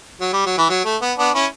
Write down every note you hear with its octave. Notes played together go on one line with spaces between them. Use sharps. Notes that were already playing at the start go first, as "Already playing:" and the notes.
F#3
G3
F#3
E3
F#3
A3
B3
B3 D4
C#4 E4